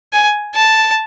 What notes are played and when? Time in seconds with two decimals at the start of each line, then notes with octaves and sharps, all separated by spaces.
0.13 G#5
0.55 A5